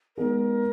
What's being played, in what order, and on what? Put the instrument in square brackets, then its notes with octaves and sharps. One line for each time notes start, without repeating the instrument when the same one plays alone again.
[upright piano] G#3 B3 D#4 G#4 [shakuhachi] A#4